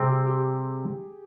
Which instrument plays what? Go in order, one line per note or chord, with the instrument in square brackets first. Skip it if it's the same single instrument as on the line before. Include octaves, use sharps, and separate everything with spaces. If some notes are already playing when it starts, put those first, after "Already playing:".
Already playing: [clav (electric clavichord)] C3 G3 C4 [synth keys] G#4
[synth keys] G4
G4